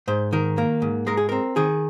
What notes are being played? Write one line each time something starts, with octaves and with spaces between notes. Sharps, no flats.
G#2 C5
D#3 A#4
A#3
G#2
G#3 A#4
G#4
C4 A#4
D#3 G#4